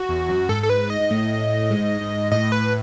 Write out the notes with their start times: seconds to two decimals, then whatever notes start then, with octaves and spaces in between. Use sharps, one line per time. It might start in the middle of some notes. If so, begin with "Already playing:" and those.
Already playing: F#4
0.09 E2
0.29 F#2
0.49 G#2 A4
0.63 A4
0.70 B4
0.90 D#5
1.00 G#2
1.10 A2
1.70 G#2
2.01 G#2
2.31 A2 D#5
2.52 B4